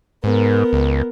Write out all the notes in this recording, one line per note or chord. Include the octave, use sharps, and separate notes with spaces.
G#2 B3 A#4
C#2